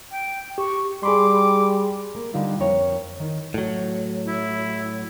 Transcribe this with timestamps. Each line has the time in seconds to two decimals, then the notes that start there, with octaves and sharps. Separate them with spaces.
0.11 G5
0.58 G4 C#6
1.03 G3 G#4 B5 C6 D6
2.15 A#3
2.34 D3 G3 D#4 F4
2.60 F2 A#3 A#4 C#5 G5
3.20 D#3
3.54 A2 F#3
4.27 E4